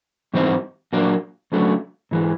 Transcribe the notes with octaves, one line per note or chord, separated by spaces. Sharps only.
G#2 E3 G3 C4 D#4
A#2 F#3 A#3 D4
C#2 C#3 F#3 A3 D4
G#2 E3 G#3